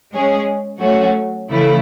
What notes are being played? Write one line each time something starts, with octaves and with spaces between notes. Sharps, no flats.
G#3 C#4 G#4
F#3 A3 C#4 F#4
C#3 E3 A3 E4